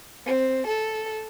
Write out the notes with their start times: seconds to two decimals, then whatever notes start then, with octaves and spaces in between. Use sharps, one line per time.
0.25 C4
0.66 A4